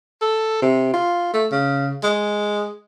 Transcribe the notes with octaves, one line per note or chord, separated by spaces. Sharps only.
A4
C3
F4
A3
C#3
G#3